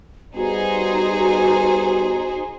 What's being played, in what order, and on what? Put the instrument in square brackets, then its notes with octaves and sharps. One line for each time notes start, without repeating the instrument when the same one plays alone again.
[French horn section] G3 B3 [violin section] D#4 G#4 C5 [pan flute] F#4